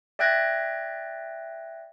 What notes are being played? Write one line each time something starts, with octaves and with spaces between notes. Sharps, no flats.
D5 E5 G5 F#6 G#6 A#6